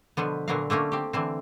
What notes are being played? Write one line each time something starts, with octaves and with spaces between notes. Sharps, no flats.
B2 D3 F3 B3
A#2 D3 F#3 B3 A#4 F5
D3 A3 A#3 C#4
C4 G4
D3 E3 C4